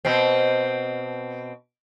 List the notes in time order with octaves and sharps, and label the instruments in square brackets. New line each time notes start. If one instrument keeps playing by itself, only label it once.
[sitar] B2 C4